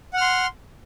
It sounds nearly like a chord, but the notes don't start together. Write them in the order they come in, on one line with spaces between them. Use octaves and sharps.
F#5 F6 C6